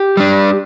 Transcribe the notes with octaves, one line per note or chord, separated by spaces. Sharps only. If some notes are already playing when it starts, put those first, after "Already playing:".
Already playing: G4
G3 D4